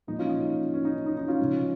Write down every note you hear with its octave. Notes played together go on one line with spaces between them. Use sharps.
A#2 F3 G#3 D#4
C#4 F4
D#4
C#4
D#4
D#4
D#4
C#4 F4
C#3 F3 G#3